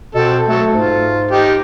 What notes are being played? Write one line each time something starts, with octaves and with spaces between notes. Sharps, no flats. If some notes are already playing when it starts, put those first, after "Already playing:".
B2 C4 A4
F#3 A3 A4
G#2 F4
D#4 G4